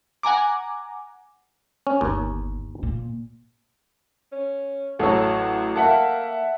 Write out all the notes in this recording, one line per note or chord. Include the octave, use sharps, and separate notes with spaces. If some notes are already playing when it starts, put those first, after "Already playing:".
F#5 G#5 A#5 D6
C#4
G1 D#2
A#2
C#4
A1 F#3 F#4 A4 C#5
A#3 E5 F#5 A5